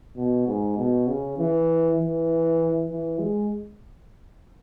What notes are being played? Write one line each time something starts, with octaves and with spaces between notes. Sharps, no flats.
B2
G#2
B2
C#3
E3
E3
E3
G#3